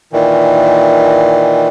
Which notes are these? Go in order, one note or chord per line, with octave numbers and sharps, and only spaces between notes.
A#2 D#3 E3